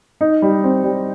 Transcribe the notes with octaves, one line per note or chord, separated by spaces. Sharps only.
D#4
G3
C4
G3